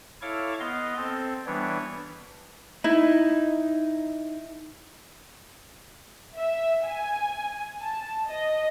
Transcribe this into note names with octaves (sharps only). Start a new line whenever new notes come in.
E4 A4 C#5 F5 C#6 D6
B3 D#5 F5 C6
C4 A4
E3 G3 B3 D4 C#5
D#4 E4
E5
G#5
A5
D#5